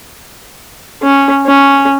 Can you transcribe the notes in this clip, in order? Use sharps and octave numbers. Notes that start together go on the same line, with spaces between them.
C#4
C#4